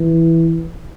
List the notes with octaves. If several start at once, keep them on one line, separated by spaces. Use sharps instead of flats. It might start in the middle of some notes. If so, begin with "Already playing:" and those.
Already playing: E3